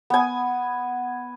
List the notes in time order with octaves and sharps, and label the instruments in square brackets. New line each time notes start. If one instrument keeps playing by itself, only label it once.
[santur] B3 G#5